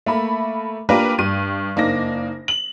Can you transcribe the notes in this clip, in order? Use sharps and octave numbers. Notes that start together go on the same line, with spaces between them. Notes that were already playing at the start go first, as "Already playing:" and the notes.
A3 A#3 B5
A#3 D4 F4 G4 A#4 B4
G2 D#7
F#1 A#3 D4 D#4 A#6
F#7